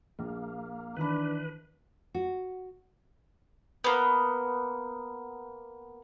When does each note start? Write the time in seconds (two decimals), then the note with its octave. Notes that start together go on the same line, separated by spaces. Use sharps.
0.19 A#1 A#3
0.97 D#3 E3 D4 B4 B5
2.14 F#4
3.84 A#3 B3